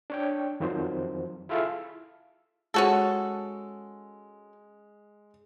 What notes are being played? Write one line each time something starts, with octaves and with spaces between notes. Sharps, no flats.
D4 C#5 G5
F2 D#3 F3 F#3 C5
E4 F4 G#4 A4 E5 F5
G#3 C#4 F#4 A4